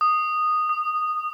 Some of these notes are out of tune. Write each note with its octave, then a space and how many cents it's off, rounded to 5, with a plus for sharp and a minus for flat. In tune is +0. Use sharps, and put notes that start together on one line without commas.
D#6 -10
D#6 -30